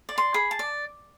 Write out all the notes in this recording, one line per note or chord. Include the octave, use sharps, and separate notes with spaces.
D5
C6
G#4 B5
A5
D5